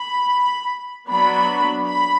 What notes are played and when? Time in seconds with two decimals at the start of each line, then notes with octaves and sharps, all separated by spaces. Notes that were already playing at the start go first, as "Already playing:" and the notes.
Already playing: B5
1.10 F#3 B3 D4 B5
1.87 B5